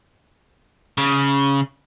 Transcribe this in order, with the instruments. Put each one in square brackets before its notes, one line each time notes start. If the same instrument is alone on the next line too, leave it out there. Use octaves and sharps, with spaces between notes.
[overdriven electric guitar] C#3